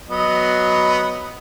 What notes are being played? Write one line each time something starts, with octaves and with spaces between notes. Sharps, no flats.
F#3 B3 D#5